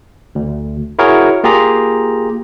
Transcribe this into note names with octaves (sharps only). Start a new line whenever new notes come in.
D2
E4 F#4 G#4 A#4 C#5
A#3 F4 G4 G#4 A#5